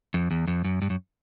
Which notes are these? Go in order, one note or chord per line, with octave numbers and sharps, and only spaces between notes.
F2
E2
F2
F#2
G2
F#2